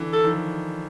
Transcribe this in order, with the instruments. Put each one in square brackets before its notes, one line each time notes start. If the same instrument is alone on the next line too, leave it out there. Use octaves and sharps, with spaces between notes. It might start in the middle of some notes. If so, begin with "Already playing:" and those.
Already playing: [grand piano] D3 E3
[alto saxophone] A4
[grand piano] D#3 F3